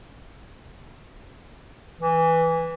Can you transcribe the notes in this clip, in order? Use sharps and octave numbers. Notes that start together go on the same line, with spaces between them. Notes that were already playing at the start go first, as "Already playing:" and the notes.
E3